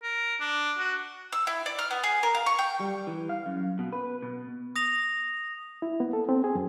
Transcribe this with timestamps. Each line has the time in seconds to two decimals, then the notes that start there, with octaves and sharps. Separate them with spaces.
0.03 A#4
0.40 D4
0.79 F#4
1.32 E6
1.47 E4
1.66 D5
1.79 F6
1.91 B3
2.04 G#4
2.23 A#4
2.35 F5
2.46 C#6
2.59 G5
2.80 G3
3.07 E3
3.29 F5
3.46 F#2
3.79 B2
3.93 B4
4.22 B2
4.76 D#6 A#6 F7
5.82 E4
6.00 B3
6.13 A4
6.29 C4
6.44 G#4
6.55 F#2